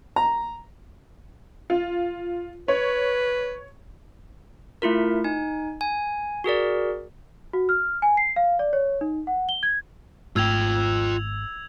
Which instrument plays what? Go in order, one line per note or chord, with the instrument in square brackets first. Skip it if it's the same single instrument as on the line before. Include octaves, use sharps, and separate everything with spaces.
[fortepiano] A#5
[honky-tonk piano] F4
[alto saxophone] B4 [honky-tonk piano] C#5
[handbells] A3 E4 F4 A#4
D#4 G#5
G#5
F#4 G#4 A#4 D5
[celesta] F#4
F6
G#5
C7
F5
D5
C#5
D#4
F#5
G7
G#6
[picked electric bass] G#1 G#2 A3 [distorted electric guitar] F4 G5 [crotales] E6 G#6 F7